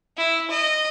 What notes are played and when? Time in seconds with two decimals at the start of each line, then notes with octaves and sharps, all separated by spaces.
0.17 E4
0.50 D#5